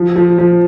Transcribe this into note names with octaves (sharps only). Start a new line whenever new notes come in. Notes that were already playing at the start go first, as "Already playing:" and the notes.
Already playing: F3
F3
F3